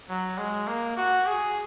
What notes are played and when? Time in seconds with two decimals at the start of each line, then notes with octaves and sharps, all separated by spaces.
0.09 F#3
0.38 G#3
0.67 A#3
0.97 F#4
1.27 G#4